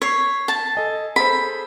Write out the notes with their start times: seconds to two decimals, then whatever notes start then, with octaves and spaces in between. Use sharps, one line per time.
0.02 C#5 B6 C7
0.48 A5
0.75 A4 D#5 G#5
1.16 G#4 A4 C5 B5